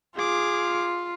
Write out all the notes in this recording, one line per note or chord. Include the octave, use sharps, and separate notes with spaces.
F4 G#4 D6